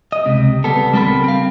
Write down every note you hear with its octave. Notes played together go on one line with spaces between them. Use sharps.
D#5
C#2 C3
G3 B3 A4
C#2 G3 C4 A4 A#4 B5
C4 F5